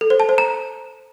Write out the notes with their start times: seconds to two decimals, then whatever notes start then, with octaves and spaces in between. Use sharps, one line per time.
0.01 A4
0.10 C5
0.20 A5
0.29 C5
0.38 A#5